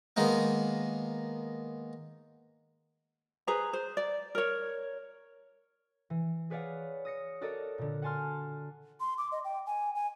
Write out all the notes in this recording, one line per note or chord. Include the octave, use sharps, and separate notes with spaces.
D#3 G#3 A#3 B3 D#4
G#4 B4 C5 A#5
C5
D5
A#4 C#5
E3
G#4 B4 C#5 D5 F5 F#5
D#6 A#6 C#7
F#4 A4 A#4 D5 D#5
A#2 D3
F#5 G#5 A5 C6 F6
C6
D6
D#5
G5
G#5
G#5